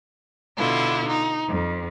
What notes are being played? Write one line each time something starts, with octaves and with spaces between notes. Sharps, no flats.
B2 D3 E4 F4
D#4
F2